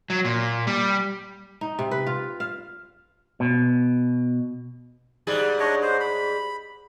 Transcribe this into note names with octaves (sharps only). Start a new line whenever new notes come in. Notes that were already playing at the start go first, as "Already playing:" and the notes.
F#3
A#2
G3
D#4
C3
B4
F4
F5
B2
G#2 G3 G#4
D4 C#5 D#5
C5
B5